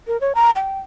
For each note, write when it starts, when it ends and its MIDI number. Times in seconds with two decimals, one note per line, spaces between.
0.07 0.19 70
0.21 0.33 73
0.35 0.50 82
0.56 0.79 79